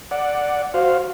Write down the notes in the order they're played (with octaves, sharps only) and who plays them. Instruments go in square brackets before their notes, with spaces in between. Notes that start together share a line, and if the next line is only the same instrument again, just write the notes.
[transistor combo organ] D5 F#5
F#4 C5 F5